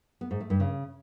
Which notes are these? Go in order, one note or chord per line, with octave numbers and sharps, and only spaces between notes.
B3
G#2
A3
G2
C#3